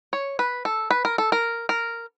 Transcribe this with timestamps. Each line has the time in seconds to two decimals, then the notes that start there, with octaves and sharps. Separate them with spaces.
0.13 C#5
0.39 B4
0.65 A4
0.90 B4
1.05 A#4
1.18 A4
1.32 A#4
1.69 A#4